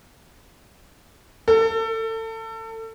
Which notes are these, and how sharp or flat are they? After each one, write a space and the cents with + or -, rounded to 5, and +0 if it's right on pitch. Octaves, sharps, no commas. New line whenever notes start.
A4 +30